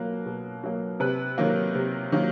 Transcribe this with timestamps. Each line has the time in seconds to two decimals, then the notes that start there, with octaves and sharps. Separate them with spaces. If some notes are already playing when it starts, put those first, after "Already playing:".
Already playing: B2 F#3 A#3 B4
0.26 B2
0.64 F#3 A#3
1.00 C3 B4
1.38 D#3 F#3 A#3
1.75 C3
2.12 D#3 F#3 A#3